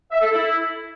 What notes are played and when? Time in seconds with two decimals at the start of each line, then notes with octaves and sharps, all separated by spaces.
0.11 E5
0.21 A4
0.31 E4